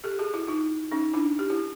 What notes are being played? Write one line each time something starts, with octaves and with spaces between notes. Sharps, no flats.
G4 A4
F#4 G#4
E4 F#4
D#4 F4
C#4 D#4
D4 E4
G4
E4 F#4